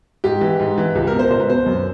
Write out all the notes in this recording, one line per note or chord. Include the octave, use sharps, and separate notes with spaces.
G#2 G4
E3
G#2
E3
C#2 G4
A#4
B2
C5
C#2 C5
B4
B2 C5
F#2